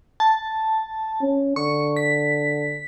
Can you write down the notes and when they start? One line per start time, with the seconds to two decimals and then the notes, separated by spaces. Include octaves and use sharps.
0.20 A5
1.21 C#4
1.56 D3 C#6
1.96 B6